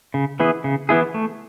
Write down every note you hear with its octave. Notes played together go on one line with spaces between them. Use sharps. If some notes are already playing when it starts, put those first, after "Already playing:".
C#3
E3 B3 E4 G#4
C#3
E3 B3 E4 G#4
A3